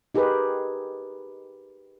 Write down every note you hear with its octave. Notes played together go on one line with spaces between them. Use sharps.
D#4 G4 G#4 A#4 B4